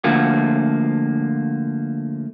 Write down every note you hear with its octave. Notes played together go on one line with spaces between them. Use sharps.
D3 F3 A3 A#3 F4 F#4